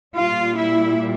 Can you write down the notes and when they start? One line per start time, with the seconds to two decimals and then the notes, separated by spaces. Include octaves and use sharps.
0.16 A#2 G3 F4
0.55 E4